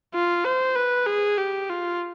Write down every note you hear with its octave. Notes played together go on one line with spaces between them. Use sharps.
F4
C5
B4
G#4
G4
F4